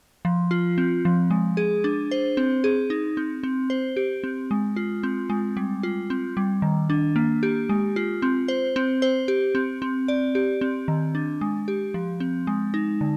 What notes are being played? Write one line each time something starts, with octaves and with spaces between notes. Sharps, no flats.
F3
F4
C4
F3
G#3
G#4
D4
C5
C4
G#4
D#4
C4
C4
C5
G4
C4
G#3
F4
C4
G#3
G3
F4
C4
G3
D#3
D4
A#3
G4
G#3
F4
C4
C5
C4
C5
G4
C4
C4
D5
G4
C4
D#3
D4
G#3
G4
F3
C4
G#3
D#4
D3